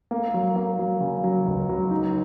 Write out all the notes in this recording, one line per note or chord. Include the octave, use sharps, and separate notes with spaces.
A#3
F#3
A#3
F#3
C#3
F#3
C#2
F#3
D#4